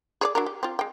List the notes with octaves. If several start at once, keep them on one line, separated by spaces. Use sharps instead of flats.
G#4 C#5 D5
F#3 D4 A#4
G4
C4 F4
G#3 G5